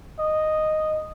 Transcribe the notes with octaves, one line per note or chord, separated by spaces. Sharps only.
D#5